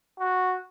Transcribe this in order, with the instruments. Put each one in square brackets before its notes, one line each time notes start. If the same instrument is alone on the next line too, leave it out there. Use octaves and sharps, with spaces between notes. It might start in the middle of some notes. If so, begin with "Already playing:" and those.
[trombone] F#4